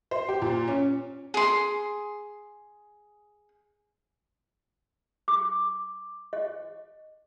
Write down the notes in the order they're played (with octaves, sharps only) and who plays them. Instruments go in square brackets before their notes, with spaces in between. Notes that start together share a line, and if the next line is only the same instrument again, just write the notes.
[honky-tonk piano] C5
G4
A#2
C#4
[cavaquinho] G#4 C6
[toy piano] D6
D#5